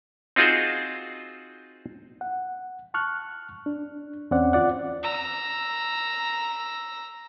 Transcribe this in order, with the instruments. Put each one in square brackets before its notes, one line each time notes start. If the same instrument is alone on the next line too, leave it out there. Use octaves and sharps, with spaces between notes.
[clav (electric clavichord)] C4 D#4 F4 F#4 G#4 C5
[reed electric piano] F#5
A5 C#6 F6 F#6
D4
E2 C4 C#4 D5 F#5
D#2 F4 D5 F#5
[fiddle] A#5 E6